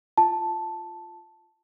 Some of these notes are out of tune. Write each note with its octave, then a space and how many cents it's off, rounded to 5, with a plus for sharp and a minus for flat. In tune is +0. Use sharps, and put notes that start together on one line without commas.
F4 +0 A5 +0